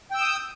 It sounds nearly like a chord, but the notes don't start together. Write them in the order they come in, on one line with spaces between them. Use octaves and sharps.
G5 E6 G6 D#6